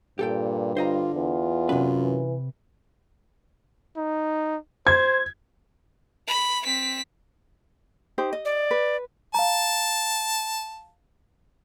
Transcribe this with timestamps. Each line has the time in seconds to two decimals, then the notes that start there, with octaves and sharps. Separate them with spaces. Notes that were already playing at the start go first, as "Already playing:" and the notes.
0.19 G2 A#2 G4 A4 G5
0.77 D3 F4 C5 D#5 A#5
1.14 E2 F4
1.69 F#2 C3 B4
2.00 E3
3.97 D#4
4.87 C5 G#6
6.28 B5
6.63 C4 B6
8.18 D#4 G4 C5
8.33 D#5
8.45 D5
8.71 B4
9.34 F5 A5 A#5